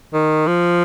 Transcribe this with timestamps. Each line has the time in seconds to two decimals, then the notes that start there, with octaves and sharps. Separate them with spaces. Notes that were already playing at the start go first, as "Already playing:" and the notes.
0.13 D#3
0.47 F3